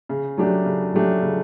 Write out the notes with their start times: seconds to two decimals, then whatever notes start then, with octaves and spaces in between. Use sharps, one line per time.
0.09 C#3
0.38 F#3 A3 D4 G4
0.66 C#3
0.94 F#3 A3 D4 G4
1.22 C#3